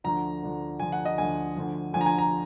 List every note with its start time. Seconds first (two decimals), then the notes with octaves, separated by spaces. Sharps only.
0.04 D2 D3 F3 A#5
0.43 D2 D3 F3
0.80 D2 D3 F3 G#5
0.92 F#5
1.05 D#5
1.18 D2 D3 F3 G#5
1.56 D2 D3 F3
1.93 D2 D3 F3 G#5
2.01 A#5
2.06 G#5
2.18 A#5